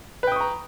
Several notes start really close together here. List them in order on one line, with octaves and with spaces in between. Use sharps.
B4 G5 D#6 C#6 A#5